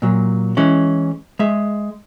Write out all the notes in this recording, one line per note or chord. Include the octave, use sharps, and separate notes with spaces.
A#2 F#3
E3 G#3 C#4
G#3 E5